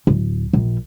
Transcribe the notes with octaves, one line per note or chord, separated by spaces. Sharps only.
D1
A#1